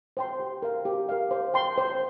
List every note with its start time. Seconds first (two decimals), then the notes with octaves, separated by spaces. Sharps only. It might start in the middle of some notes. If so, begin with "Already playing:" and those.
0.17 C5 G5 C6
0.40 G4
0.62 A#4 F5
0.85 G4
1.09 A#4 F5
1.31 C5
1.54 G5 C6
1.78 C5